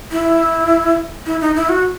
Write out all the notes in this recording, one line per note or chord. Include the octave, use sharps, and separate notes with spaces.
E4
E4
D#4
E4
F#4